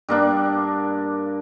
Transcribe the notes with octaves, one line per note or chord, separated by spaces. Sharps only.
G2 A#3 D4